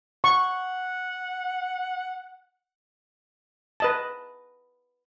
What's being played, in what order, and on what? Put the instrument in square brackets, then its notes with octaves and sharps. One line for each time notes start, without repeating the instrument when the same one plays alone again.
[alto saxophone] F#5 [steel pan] C#6
[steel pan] B4 D#5 A5